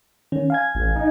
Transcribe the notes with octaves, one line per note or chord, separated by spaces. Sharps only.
D#3 C#4
F5 G#5 G#6
A1
D#4